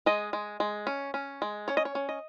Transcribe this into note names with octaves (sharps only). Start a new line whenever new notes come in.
G#3 D#5
G#3
G#3
C#4
C#4
G#3
C#4 C#5
D#5
C#5
C#4
D#5